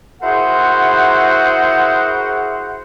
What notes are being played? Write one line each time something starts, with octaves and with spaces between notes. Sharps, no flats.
E4 F#4 G#4 A#4 C5 F#5